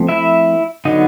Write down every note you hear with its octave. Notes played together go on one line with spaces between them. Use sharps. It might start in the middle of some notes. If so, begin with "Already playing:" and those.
Already playing: F3 A3 C4
E4 E5
D3 F#3 B3 D#4 D#5